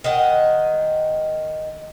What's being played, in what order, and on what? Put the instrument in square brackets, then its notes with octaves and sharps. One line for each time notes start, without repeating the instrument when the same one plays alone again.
[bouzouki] D#3 D#5 F#5